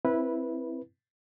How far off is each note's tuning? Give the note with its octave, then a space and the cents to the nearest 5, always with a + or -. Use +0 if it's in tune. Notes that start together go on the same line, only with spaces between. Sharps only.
C4 +0 E4 +0 B4 -15